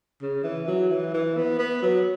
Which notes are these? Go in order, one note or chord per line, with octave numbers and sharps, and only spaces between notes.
C#3
E3
F#3
E3
E3
B3
B3
F#3